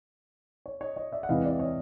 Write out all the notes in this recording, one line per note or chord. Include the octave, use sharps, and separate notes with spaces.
C#5
C#5 D#5
C#5 D#5
D5 E5
F#5
E2 C3 E3 G#3 C4 D#5 F5
D5 E5
C#5 D#5